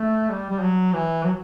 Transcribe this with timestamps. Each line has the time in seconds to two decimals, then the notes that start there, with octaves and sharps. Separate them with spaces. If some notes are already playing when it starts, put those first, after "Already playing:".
Already playing: A3
0.30 G3
0.51 G3
0.61 F#3
0.93 E3
1.24 F#3